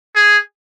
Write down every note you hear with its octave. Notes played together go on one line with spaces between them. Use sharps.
G#4